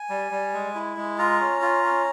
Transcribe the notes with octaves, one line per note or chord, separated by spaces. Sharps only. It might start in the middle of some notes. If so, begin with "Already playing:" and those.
Already playing: G#5
G3
G3
G#3
E4
G#3
F4 A#5
C#4
F4
C#4